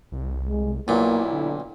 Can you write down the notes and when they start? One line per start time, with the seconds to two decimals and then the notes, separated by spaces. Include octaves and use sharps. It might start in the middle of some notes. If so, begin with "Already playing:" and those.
0.12 C2
0.48 G#3
0.88 B1 A#2 A#3 E4
1.32 D3